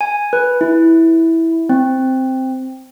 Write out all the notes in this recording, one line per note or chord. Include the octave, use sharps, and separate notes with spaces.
G#5
B4
E4
C4